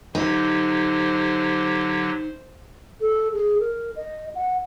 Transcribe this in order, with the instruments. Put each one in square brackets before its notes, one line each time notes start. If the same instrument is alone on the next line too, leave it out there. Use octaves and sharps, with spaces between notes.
[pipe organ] D3 F#3 G4 [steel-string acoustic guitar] D#4 [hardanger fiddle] C5
[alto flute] A4
G#4
A#4
D#5
F#5